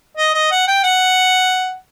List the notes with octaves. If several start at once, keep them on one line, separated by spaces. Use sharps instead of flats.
D#5
D#5
F#5
G5
F#5